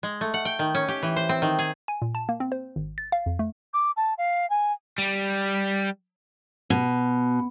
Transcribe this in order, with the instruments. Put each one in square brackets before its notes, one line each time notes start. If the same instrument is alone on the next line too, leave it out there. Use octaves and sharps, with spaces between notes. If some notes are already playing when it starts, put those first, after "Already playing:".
[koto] G#3
A3
F#5
G5
D#3
C#4
G4
E3
C5
C4
D#3
G#4
[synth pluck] G#5
A#2
A5
A#3
C4
C5
G#1
A6
F5
F2
A3
[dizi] D6
A5
F5
G#5
[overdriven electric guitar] G3
[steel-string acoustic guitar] B2